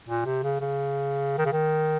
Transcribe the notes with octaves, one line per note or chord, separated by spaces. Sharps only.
A#2
C3
C#3
C#3
D#3
C#3
D#3